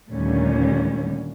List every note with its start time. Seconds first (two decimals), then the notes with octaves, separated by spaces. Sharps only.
0.11 D#2 A#2 D3 G3 A3 C#4